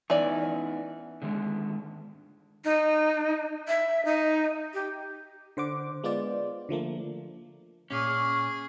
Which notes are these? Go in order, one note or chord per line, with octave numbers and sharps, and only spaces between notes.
E3 B3 C#4 D#4 D5
D3 D#3 G#3
D#4
E5
D#4
G4
D3 C5 F#5 D6
G#3 B3 F4 C5 D5
D3 F3 A3 A#3
A#2 C#4 G#4 C#6 D6 F6